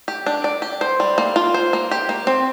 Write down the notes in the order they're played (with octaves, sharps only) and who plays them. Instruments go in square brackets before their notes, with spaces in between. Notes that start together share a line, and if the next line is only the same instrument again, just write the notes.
[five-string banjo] G4
D4
D5
G4
C5
G3
A#3
F4
C5
A#3
G4
A#3
C4